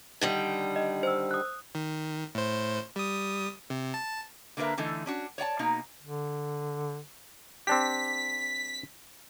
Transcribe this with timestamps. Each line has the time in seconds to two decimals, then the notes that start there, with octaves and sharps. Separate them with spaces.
0.21 D3 D#3 G3
0.76 D#5
1.03 C5 E6
1.31 D#6 F#6
1.75 D#3
2.35 A2 C5
2.96 G3 D#6
3.70 C3
3.94 A5
4.57 D3 A#3 D4 A#4 B4 E5
4.78 D3 E3 A3 D#4 A4
5.06 C#4 D4 F#4
5.38 C#5 D5 F#5 A5
5.59 B2 A#3 D#4
6.02 D3
7.67 C4 D4 G4 B6